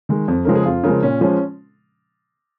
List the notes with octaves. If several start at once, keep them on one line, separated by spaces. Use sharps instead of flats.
D#3 G#3
F2
C#3 F3 G#3 A#4
G#4
F2 F4
C#3 F3 G#3 A#4
A#2 C#4
F3 G#3 C#4